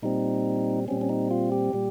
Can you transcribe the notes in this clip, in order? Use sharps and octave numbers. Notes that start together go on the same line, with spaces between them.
A#2 G3 C4 D#4
A#2 G3 C4 C#4
C#4
D#4
F4
G4
A#2 G3